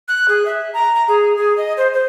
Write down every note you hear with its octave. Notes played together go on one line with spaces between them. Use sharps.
F#6
G#4
E5
A#5
A#5
G#4
G#4
D#5
C5
C5